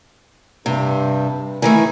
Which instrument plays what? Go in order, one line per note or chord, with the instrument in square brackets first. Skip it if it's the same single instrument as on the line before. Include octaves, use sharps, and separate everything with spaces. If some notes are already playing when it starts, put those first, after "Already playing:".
[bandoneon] G2 [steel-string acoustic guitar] C3
[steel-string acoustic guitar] D#3 E3 A3 [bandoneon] G#5